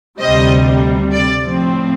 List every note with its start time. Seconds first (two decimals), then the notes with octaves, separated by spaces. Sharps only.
0.21 D2 C3 G3 C5 D#5
1.12 D5
1.44 A2 F3 C4